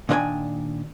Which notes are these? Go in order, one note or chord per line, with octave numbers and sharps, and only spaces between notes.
A#2 D#3 D4 C5 G5 G#5